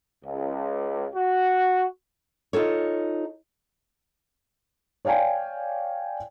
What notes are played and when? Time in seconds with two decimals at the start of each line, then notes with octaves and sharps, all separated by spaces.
0.25 C#2
1.14 F#4
2.53 D#4 F4 A4 C#5
5.05 C#5 D5 F5 G5 G#5